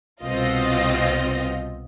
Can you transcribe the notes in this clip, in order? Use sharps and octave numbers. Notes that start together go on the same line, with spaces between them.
C2 B2 C4 F4 D#5